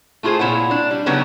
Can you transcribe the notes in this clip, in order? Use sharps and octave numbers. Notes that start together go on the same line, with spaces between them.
A3 E4 F4 G#4 C5
A#2 E4 C#5 F#5
D4
G3
C#3 F#3 B3 D#4 G4 C#5